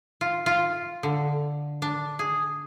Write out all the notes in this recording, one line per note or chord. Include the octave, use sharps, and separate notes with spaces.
F4
F4
D3
D4
G#4